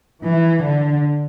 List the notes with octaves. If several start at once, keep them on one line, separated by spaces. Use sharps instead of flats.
E3
D3